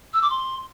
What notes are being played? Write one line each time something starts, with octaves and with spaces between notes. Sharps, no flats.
E6
D6
C6